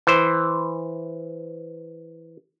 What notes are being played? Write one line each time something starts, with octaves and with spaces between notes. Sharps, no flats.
E3 C5